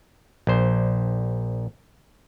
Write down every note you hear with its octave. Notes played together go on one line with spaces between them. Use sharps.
A#1 C5